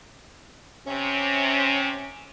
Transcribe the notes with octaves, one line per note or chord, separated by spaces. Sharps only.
C3 C#4